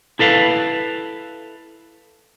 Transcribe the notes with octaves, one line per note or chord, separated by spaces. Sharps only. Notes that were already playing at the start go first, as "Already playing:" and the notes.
E4 A4 B4 F5